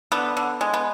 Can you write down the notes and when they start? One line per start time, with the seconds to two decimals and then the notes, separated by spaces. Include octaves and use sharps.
0.12 D3 B3
0.37 D3
0.61 G#3
0.74 B3